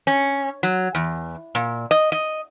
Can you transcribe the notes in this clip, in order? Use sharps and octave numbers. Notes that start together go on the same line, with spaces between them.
C#4
F#3
E2
A#2
D#5
D#5